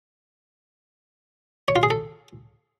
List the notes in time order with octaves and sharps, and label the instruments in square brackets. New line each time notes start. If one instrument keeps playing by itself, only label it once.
[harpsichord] C#5
F4
G#4
A4